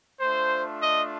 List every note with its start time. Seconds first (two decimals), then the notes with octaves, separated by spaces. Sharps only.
0.21 A3 D4 F4 C5
0.83 D#5